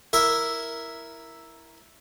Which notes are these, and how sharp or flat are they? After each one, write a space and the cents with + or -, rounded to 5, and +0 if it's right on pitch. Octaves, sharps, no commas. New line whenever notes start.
E4 +0 A#4 +0 E5 +0